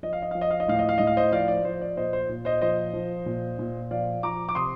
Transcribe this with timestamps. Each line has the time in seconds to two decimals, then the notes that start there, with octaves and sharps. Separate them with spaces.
0.03 F3 D#5
0.13 F5
0.22 D#5
0.31 F3 F5
0.41 D#5
0.51 F5
0.60 D#5
0.68 A2 F5
0.79 D#5
0.89 F5
0.98 A2 D#5
1.07 F5
1.17 C5 D#5
1.32 F3 D5 F5
1.48 D5
1.64 F3 C5
1.81 D5
1.96 A#2 C5 D#5
2.13 C5
2.29 A#2
2.45 C5 D#5
2.62 F3 C5 D#5
2.93 F3
3.26 A#2
3.59 A#2
3.91 F3 D5 F5
4.23 F3 A#5 D6
4.49 D6
4.55 C3 C6 D#6